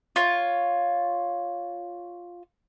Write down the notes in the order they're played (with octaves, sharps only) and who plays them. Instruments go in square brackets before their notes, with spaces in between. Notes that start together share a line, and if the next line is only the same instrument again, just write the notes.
[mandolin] F4 C#5